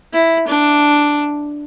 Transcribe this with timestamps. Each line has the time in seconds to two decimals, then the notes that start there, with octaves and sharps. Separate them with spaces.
0.13 E4
0.48 D4